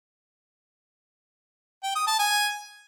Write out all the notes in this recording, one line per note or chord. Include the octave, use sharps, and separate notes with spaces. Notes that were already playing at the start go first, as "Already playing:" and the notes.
G5
D#6
A5
G#5